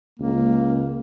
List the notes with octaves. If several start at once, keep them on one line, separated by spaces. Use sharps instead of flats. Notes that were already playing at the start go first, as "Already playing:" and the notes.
C#2 A#3